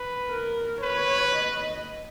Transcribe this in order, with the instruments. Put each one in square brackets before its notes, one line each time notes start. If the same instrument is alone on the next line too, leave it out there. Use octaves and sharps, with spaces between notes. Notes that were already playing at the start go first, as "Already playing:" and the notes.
Already playing: [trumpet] B4
[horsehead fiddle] A#4
[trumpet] B4 [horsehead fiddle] C#5
[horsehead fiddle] D#5